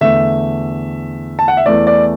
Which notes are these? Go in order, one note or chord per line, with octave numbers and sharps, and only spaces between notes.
E2 D3 A3 E5
A5
F#5
E5
E2 E3 A3 D5
D5